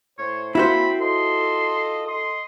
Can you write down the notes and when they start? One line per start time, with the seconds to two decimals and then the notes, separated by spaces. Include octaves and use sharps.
0.18 A2 C5 C#5
0.55 A#3 C4 E4 F#4 C5 B5
1.01 F4 A4 D#5 C6
2.06 A4 D#5 C6